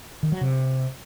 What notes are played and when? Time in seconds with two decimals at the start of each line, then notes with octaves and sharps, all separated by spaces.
0.23 D#3
0.32 F#3
0.41 C3